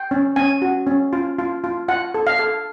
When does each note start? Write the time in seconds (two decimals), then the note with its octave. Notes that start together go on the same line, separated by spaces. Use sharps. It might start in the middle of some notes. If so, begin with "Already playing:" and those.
Already playing: G5
0.11 C#4
0.36 C#4 G#5
0.62 F#4
0.87 C#4
1.13 F4
1.39 F4
1.64 F4
1.88 F4 F#5
2.14 A4
2.27 F5
2.39 A4